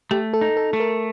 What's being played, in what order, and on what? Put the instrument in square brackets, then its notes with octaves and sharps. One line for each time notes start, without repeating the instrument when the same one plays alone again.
[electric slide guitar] A3 [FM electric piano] G4
[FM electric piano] A4
[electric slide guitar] D#4
[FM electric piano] A4
[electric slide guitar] A3
[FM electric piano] A#4